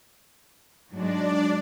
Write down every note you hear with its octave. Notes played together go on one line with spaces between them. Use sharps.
G#2 F#3 G#3 D4 D5